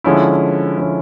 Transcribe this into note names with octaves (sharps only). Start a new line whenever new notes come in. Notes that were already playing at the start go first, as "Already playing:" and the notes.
D3 F3 G#3 C#4 E4
D3 F3 G#3 C#4 E4